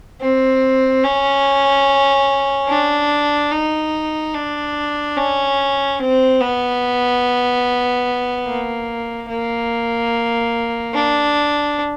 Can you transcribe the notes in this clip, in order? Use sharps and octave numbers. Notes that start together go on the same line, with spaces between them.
C4
C#4
D4
D#4
D4
C#4
C4
B3
A#3
A#3
D4